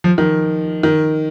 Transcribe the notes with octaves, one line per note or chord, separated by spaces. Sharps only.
F3
D#3
D#3